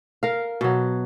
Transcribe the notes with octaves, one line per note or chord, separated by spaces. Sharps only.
A#4 F5
B2 F#3